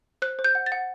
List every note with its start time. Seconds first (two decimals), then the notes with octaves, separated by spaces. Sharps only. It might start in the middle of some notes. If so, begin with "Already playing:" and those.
0.22 C5 F#6
0.39 C5
0.44 G6
0.55 F#5
0.66 A6
0.72 F#5